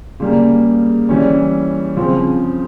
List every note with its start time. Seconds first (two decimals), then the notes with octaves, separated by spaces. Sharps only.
0.20 C#3 G3 A#3
1.09 E3 G3 C#4
1.97 C#3 F3 C4